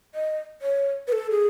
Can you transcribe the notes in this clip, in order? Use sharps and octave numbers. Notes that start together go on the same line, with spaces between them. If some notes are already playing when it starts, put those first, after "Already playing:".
D#5
C#5
B4
A4
G#4